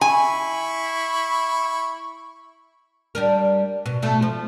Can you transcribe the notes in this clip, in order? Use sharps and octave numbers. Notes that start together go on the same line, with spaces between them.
E4 G#5 B5 C#6
G3 D4 A#4
B2
B2 A3 A4
F3